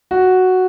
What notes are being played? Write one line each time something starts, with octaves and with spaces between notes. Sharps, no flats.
F#4